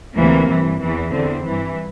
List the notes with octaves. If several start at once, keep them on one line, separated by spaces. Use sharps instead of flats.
D2 C3 E3 A#3
G2 E3
E2 E3
E2 D3 C4
G2 E3